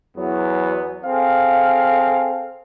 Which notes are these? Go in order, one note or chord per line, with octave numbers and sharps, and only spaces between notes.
E2 F#3 B3
C4 G#4 A4 F5